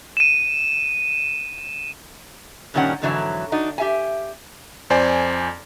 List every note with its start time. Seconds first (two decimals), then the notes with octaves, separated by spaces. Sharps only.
0.17 D#7 E7
2.74 G2 A#2 D#3 G3 C#4 F#5
3.02 F2 G#2 D3 E3 F#3 E4
3.52 D4 D#4 F#4
3.78 G4 E5 G#5
4.90 F2 C5 D5 G#5